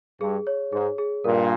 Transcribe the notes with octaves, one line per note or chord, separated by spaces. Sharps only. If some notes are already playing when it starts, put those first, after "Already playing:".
G2 G#4
C#5
G#2 G#4
G#4
G2 A#2 A#4